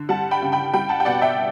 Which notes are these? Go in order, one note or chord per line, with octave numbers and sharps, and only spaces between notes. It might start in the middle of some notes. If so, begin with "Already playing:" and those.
Already playing: D3
G3 F#5 A5
G5 B5
C#3
G5 B5
G3 G5 B5
F#5 A5
G5
B2 D5 F#5
E5 G5